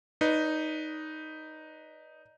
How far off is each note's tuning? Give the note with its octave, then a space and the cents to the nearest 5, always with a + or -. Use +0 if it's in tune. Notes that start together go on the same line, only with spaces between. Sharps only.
D#4 +0 B4 +0 D5 -25